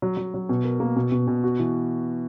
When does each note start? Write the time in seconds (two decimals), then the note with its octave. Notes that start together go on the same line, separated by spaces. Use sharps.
0.02 F#3
0.17 F#3
0.34 F#3
0.49 B2
0.65 A#4
0.80 A#3
0.96 B2
1.12 B2
1.28 B2
1.44 F#4
1.60 E3